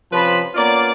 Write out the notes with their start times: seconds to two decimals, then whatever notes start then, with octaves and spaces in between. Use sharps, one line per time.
0.12 C3 F3 C#4 B4 A5 B5
0.55 A#3 B3 C#4 F4 D5